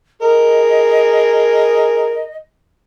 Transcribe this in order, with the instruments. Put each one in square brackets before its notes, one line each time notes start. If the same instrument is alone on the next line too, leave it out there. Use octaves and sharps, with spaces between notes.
[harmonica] G#4 A#4 [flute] D#5